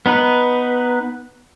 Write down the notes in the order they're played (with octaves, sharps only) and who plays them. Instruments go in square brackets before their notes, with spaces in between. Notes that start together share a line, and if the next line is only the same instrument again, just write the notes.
[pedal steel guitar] B3 D#4 B4